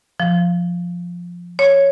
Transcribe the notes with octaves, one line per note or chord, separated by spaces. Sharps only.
F3
C#5